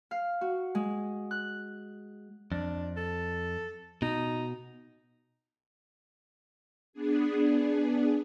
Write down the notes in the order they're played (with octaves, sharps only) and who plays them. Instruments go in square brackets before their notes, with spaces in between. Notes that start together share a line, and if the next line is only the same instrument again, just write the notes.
[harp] F5
F#4
G#3
F#6
[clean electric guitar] F2 [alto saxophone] D4
[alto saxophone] A4
[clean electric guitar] B2 [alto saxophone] D#4
[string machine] B3 D4 G#4